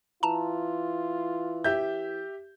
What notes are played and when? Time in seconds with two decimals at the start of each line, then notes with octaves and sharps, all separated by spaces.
0.23 E3 F4 A5 A#5
1.64 G4 E5 G6